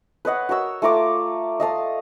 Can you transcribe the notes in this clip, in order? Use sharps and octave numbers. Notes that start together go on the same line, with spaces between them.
B4 C#5 D#5 F#5
F#4 A#4 C#5 E6
A3 F4 A#5 D6
D#5 F5 A5 D#6